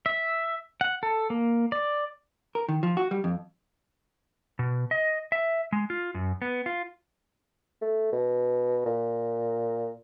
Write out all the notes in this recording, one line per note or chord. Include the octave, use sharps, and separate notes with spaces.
E5
F#5
A4
A#3
D5
A#4
D#3
F3
F#4
G3
F2
B2
D#5
E5
G#3
F4
F#2
B3
F4
A3
B2
A#2